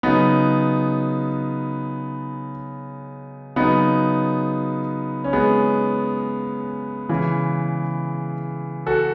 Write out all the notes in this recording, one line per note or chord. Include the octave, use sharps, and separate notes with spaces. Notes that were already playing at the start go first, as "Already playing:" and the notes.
C#3 F#3 B3 D#4
C#3 F#3 B3 D#4
C#4
G#3 B3
C#3 E3
F#4 A4